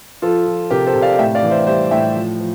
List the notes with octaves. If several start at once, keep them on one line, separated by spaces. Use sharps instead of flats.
F3 F4 A4
F3
C3 G4 A#4
A4 C5
C3
D5 F5
A2 E5 G5
D5 F5
E3
C5 E5
G3 C5 E5
A2 E5 G5
F3
F3